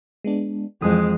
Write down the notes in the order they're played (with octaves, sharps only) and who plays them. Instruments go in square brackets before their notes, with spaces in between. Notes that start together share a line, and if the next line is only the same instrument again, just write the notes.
[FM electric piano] G#3 B3 D4
[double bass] F2 G#3 [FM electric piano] E3 D#6